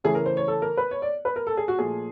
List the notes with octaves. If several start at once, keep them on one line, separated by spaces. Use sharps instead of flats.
C#3 E3 A3 G#4
A#4
C5
C#5
A4
A#4
B4
C#5
D5
B4
A#4
A4
G#4
F#4
A#2 F3 A3 G#4